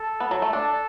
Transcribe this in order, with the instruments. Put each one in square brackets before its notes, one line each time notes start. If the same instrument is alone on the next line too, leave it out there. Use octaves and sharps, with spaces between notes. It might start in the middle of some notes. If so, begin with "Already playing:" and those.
Already playing: [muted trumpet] A4
[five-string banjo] B3
F#3
A3
D4